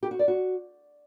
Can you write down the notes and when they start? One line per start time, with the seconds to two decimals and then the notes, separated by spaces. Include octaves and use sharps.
0.03 G4
0.11 F#4
0.19 D5
0.28 F#4